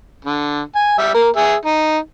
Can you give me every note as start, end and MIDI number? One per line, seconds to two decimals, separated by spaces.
0.25 0.63 50
0.76 0.96 80
0.98 1.10 55
0.98 1.10 76
1.14 1.28 58
1.14 1.28 70
1.36 1.54 68
1.36 1.54 76
1.65 1.97 63